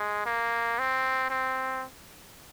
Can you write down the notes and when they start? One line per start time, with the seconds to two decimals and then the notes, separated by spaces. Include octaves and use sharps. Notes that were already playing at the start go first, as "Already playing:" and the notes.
Already playing: G#3
0.26 A#3
0.79 C4
1.30 C4